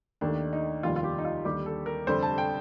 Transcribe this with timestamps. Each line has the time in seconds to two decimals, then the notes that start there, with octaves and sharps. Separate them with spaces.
0.21 D#2 D#3 A3 D4
0.53 D#4
0.83 F1 D#2 D#3 G3 F4
0.96 F4
1.04 G4
1.18 D#4
1.25 F4
1.45 D#2 D3 G3 G4
1.66 A4
1.86 A#4
2.07 F1 F2 D3 G3 C5
2.23 A5
2.38 G5